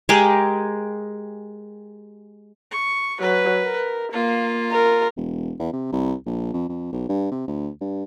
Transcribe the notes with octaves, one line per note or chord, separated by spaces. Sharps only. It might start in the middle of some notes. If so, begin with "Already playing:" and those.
G#3 G4 G#4 A#4
C#6
F#3 B4
A#4
A#3 F4
A#4
E1
E2
C3
C2
A#1
F2
F2
B1
G2
C3
D2
G2